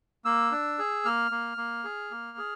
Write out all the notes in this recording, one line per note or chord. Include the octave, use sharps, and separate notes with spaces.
A#3 E6
D4
G#4
A#3 F6
A#3
A#3
G#4
A#3
G#4